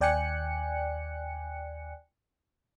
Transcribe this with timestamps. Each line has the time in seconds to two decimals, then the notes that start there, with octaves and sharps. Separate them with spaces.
0.01 D#2 D5 G5 G#5 F#6 C#7